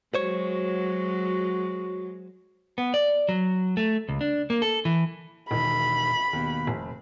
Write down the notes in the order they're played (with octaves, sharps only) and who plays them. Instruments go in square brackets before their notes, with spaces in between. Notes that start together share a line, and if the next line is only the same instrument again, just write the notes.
[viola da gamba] F#3 G#3 [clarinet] F#4 [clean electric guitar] C5 C#5
[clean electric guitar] B3
D5
F#3
A3
C#2
D4
A#3
A4
E3
[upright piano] E1 D#3 [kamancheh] B5
[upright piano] D#2 B2
F1